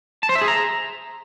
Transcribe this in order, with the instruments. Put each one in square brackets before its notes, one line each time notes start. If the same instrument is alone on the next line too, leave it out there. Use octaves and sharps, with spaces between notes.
[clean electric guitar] A5
C5
E5
G#4
A#5